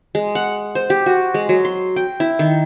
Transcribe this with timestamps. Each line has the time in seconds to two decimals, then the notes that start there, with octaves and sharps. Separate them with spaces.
0.15 G#3
0.35 F#5
0.75 C5
0.90 G4
1.06 F#4
1.34 G#3
1.49 F#3
1.65 C6
1.96 G5
2.20 E4
2.39 D#3